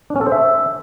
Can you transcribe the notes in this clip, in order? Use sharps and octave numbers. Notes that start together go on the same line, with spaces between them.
D4
C#4
A4
C5
E5